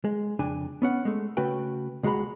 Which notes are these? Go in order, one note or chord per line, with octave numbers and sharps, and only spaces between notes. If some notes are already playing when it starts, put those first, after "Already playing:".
G#3
F2 C#3 D4 G#5
B3 C#4 F#5
G#3 A3
C#3 A3 C#4 F#4 B4 G5
C#2 G#3 F#4 G#4 A#5 B5